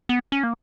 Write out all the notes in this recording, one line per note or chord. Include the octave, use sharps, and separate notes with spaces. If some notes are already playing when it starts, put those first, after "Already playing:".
B3
C#4
A#3